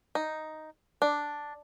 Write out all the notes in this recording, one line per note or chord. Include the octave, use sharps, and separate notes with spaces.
D#4
D4